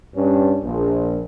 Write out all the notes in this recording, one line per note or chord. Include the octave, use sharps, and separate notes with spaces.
G2 C#4
A#1